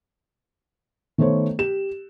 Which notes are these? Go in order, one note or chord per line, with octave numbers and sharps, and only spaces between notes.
D#3 A3 B3 C5 C#5
G4 E7